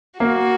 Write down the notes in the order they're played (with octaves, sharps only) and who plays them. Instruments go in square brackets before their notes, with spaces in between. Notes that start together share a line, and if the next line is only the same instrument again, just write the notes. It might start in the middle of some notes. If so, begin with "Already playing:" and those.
[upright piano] A#3 [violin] F#4